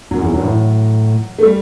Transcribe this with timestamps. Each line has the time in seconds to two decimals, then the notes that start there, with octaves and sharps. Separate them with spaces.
0.11 F#2 F#3
0.22 E2 E3
0.33 F#2 F#3
0.39 G2
0.45 A2
1.38 A3
1.43 G3